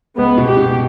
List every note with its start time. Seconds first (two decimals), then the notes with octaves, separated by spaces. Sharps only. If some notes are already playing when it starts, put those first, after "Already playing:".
0.17 C#2 B3
0.37 B2
0.47 G4
0.57 B2